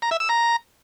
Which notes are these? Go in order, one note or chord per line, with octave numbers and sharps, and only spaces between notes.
A#5
E5
E6
A#5